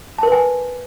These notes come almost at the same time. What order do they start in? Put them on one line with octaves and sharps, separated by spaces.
A5 A#4 B4 G#5